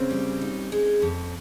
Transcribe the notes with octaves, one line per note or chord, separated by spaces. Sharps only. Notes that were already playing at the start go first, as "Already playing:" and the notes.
Already playing: C#3 C4 C#4
G3
D#4
G#3
F2